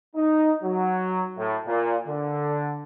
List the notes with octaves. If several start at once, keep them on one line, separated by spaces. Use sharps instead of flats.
D#4
F#3
A2
A#2
D3